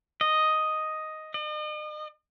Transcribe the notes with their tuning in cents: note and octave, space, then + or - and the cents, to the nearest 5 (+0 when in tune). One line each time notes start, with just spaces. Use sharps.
D#5 +5
D#5 -40